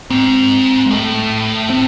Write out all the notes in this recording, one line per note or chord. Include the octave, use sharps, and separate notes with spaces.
G#2 C4
G#3
A2 A3
C4